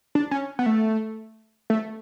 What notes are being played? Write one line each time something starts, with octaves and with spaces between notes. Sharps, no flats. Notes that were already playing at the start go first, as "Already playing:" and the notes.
D4
C#4
B3
A3
A3